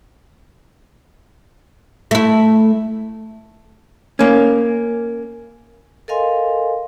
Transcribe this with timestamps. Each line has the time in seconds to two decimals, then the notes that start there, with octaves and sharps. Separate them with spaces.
2.11 A3 E4
4.19 A#3 C#4
6.08 A4 A#4 D#5 F5 G#5 C6